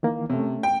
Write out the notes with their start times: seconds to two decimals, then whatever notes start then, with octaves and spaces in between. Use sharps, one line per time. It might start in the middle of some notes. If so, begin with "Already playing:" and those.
0.03 D#3 E3 A#3
0.30 C3 A3 C#4
0.63 G5